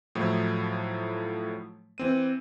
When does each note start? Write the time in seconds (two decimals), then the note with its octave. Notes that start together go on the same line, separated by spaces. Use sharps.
0.15 A2 F3 F#3 A3 E4
1.98 E3 C4 D#7